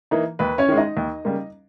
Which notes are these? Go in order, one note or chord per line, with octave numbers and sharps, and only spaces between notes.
E3 A#3 D#4
D#2 B4
C#4 C#5
D#3 G#3
D#4 D#5
D#2
C#3 G3 A#3